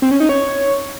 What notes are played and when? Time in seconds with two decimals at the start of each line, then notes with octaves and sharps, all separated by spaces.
0.02 C4
0.11 C#4
0.20 D#4
0.29 C#5